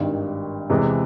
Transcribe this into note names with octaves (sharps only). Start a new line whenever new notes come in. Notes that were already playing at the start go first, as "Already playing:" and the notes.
Already playing: G#1 G2 D#3
E2 C3 E3 G#3